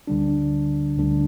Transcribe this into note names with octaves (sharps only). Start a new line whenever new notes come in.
D2 D3 G3 D4
D2 D3 G3 D4